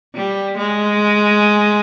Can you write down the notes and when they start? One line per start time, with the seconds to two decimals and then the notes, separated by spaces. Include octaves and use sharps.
0.15 G3
0.58 G#3